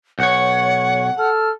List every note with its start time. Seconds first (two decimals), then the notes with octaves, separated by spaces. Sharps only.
0.19 B1 C#5 F#5 C#7
1.18 A4 F6